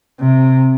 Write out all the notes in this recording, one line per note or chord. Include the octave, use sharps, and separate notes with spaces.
C3